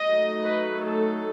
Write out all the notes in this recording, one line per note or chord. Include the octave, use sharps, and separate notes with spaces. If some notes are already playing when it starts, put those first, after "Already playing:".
Already playing: D#5
F#3 A3 D#4
B4
A4